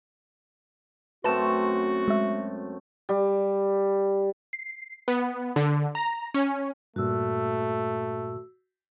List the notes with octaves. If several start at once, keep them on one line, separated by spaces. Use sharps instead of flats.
F#2 A3 C4 F#4 B4 A5 E7
G#3 E5
G3
C7
B3
D3
A#5
C#4
G2 A#2 A3 F#4 E6